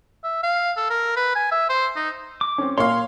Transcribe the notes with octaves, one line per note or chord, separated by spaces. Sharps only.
E5
F5
A4
A#4
B4
G#5
E5
C5
D#4
D6
C4 C#4
A#2 A#3 C#5 F5 C6